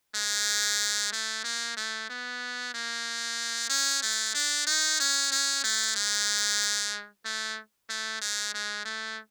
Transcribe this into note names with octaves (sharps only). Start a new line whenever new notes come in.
G#3
A3
A#3
A3
B3
A#3
C#4
A3
D4
D#4
C#4
C#4
A3
G#3
A3
A3
G#3
G#3
A3